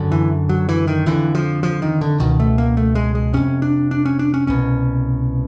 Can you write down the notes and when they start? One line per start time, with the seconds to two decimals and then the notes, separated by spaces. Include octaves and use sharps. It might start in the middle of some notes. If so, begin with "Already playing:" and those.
Already playing: F#2 D3
0.12 E3
0.49 F#3
0.69 E3
0.87 D#3
1.06 F2 D3 E3
1.35 F3
1.63 F3
1.82 D#3
2.01 D3
2.20 C#2 B2 D#3
2.40 A3
2.58 A#3
2.77 A3
2.95 G#3
3.15 G#3
3.34 F2 C3 C#4
3.62 D4
3.91 D4
4.05 C#4
4.19 D4
4.34 C#4
4.47 C2 B2 C#4